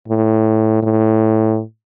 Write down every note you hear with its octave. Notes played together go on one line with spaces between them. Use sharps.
A2
A2